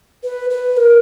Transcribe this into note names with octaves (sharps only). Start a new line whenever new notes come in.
B4
B4
A#4